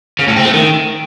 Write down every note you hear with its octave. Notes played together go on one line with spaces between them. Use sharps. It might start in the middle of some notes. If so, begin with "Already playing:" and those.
C#3
A2
C4
A3
D#3